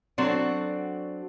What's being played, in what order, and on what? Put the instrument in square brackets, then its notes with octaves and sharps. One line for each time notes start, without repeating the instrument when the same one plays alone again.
[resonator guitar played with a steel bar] F#3 C4 D4 F#4 A4 D5